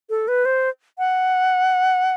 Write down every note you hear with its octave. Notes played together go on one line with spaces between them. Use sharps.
A4
B4
C5
F#5